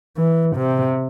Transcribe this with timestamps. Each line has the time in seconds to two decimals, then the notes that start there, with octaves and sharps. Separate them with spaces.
0.17 E3
0.57 C3